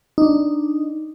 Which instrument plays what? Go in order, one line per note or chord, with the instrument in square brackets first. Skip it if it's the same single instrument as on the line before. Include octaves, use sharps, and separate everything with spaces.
[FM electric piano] D4 D#4